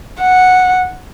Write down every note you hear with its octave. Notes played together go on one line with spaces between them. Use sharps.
F#5